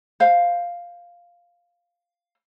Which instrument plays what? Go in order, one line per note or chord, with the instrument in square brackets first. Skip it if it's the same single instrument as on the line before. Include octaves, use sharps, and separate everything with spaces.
[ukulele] C5 F5